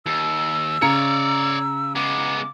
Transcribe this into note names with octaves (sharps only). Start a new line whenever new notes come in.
D#2 E6
C#3 C#5 D5 A#5 C#7
G#3 B3 D6